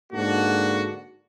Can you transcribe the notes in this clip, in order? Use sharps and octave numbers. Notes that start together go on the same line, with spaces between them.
G#2 D3 A#3 D4 F#4